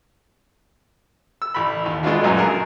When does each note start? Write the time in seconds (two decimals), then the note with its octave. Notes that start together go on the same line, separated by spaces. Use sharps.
1.42 E6
1.54 A1 B5
1.86 D#2
2.03 G#3 A3 B3 D4 F4 F#4
2.23 A#1 F#2 F#3 G#5 A#5
2.37 G#4 A#4 A5